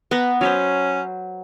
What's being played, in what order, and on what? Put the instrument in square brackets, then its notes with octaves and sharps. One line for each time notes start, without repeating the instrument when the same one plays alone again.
[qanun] B3 F#5 A#5 [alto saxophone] B4
[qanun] F#3 B4 C5 [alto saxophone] C#4